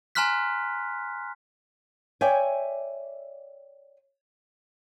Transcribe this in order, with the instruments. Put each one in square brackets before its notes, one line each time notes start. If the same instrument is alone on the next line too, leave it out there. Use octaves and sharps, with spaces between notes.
[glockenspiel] G#5 A#5 C6 F6 F#6 B6
[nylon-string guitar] C#5 D5 E5 G5 G#5